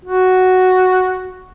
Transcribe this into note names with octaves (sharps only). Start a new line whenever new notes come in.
F#4